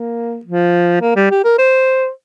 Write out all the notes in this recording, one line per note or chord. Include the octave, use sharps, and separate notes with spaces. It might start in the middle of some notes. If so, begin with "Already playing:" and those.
Already playing: A#3
F3
A#3
G3
G4
A#4
C5